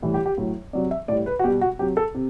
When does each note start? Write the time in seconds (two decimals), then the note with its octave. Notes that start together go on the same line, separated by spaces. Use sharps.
0.03 A2 E3 G3
0.14 G4
0.26 G4
0.38 A2 F#3
0.73 C3 F#3 D5
0.91 E5
1.08 A2 D5
1.11 G3
1.26 B4
1.39 F#4
1.44 B2 G3 G4
1.61 F#4
1.79 C3 F#3 G4
1.97 A4
2.15 C3